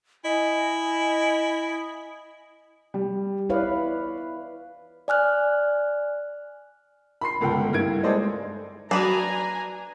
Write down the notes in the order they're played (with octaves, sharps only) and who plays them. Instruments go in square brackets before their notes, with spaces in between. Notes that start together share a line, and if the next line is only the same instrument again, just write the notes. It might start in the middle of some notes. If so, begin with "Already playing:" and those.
[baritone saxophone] E4 [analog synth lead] D#5 [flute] G#5
[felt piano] G3
[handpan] E4 B4 F5 [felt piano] C#5 D5
[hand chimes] D5 G#5 F6 F#6
[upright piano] B5 C6 C7
G1 C#2 A4 A#4 F#5 G5
G2 A#3 E4 G#6 D7
G#3 G#4 A4 C5 D5 D#5
[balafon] F#3 F#4 [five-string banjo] D4 B4 [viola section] G#5 A#5